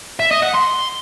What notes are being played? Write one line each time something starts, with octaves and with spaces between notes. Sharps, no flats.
E5
D#5
F#5
C6